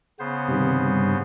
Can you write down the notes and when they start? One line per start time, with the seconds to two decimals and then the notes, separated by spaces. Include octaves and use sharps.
0.19 C#3 B3 C5
0.48 G2 C3 D#3